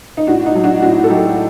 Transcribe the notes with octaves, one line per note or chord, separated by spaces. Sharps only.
D#4
A2 D4 F#4
D#4
F#3
D4 F#4
A2 D4 F#4
A4
F#3 D#4 G4